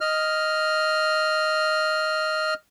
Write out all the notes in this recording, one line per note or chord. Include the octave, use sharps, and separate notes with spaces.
D#5 F6